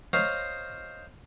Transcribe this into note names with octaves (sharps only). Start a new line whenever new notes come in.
C5 C#5 D#5 F5 A#5